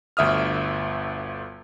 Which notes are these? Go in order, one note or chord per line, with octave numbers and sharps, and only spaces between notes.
G1 D2 E5 D#6 F6